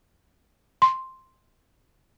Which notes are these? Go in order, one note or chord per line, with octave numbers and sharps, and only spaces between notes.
C6